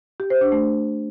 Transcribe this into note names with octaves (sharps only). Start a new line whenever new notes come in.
G4
C5
D4
A3